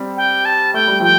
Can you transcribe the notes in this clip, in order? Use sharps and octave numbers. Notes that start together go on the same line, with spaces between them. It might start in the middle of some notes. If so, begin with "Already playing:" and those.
Already playing: G3 C4
G5
A5
A3 G5
G3
F3 A3 G5